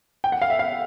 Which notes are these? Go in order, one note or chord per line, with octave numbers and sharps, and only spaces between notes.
G5
F#5
F5
E5
F5